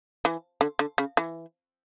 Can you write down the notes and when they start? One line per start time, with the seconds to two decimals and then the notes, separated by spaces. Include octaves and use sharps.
0.25 E3
0.61 D3
0.79 D3
0.98 C#3
1.17 E3